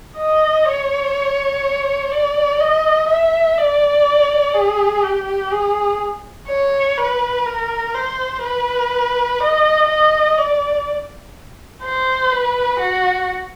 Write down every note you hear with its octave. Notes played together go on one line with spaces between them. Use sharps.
D#5
C#5
D5
D#5
E5
D5
G#4
G4
G#4
C#5
B4
A#4
C5
B4
D#5
D#5
D5
C5
B4
F#4